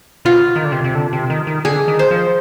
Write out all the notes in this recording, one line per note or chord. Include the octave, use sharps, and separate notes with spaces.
B2 F4
D#3
D3
C3
C3
D3
C3
D#3
D#3
D3 G#4
D#3
C5
F3